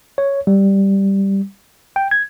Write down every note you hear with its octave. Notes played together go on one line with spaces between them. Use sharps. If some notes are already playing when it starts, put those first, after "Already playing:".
C#5
G3
G5
G#6